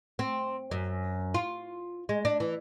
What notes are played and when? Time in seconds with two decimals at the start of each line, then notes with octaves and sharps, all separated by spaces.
0.19 C4
0.71 F#2
1.34 F4
2.09 G#3
2.25 D4
2.40 E3